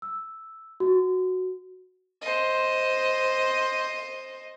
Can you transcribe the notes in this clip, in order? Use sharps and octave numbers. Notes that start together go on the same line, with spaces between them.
E6
F#4
C5 D#5